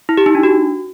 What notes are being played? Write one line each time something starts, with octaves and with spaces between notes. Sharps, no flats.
E4
G4
D#4
D4
F#4